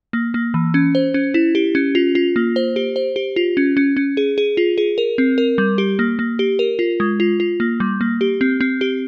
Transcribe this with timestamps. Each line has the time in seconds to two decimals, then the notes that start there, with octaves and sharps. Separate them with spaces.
0.13 A#3
0.34 A#3
0.54 E3
0.74 C#4
0.95 C5
1.14 C#4
1.34 E4
1.55 G4
1.75 C#4
1.95 F4
2.15 F4
2.36 A#3
2.56 C5
2.76 G4
2.96 C5
3.16 G4
3.36 F4
3.57 C#4
3.77 C#4
3.97 C#4
4.17 G#4
4.38 G#4
4.57 F4
4.78 G#4
4.98 A#4
5.18 C4
5.38 A#4
5.58 G3
5.78 G4
5.99 A#3
6.19 A#3
6.39 G4
6.59 A#4
6.79 F4
7.00 G#3
7.20 F4
7.40 F4
7.60 A#3
7.80 G3
8.01 A#3
8.21 G4
8.41 C4
8.61 C4
8.81 G4